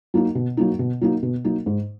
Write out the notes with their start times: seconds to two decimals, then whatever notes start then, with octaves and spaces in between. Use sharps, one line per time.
0.14 F#3 A#3 D#4
0.35 B2
0.57 F#3 A#3 D#4
0.79 B2
1.01 F#3 A#3 D#4
1.23 B2
1.44 F#3 A#3 D#4
1.66 G#2